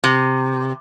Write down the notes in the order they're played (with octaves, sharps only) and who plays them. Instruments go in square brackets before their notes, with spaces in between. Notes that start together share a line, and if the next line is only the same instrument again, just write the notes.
[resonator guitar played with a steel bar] C3